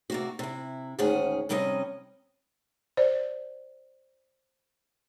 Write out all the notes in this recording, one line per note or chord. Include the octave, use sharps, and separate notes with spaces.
C3 A#3 F#4
C3 E4
D2 G#2 D#3 C#4 G#4 F#5
F2 C3 G3 C#4 A4 D#5
C5 D5